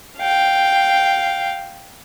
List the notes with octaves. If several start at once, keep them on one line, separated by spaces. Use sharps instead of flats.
F5 G5